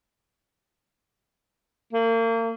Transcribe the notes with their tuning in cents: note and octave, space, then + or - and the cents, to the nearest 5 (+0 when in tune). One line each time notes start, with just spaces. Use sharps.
A#3 -35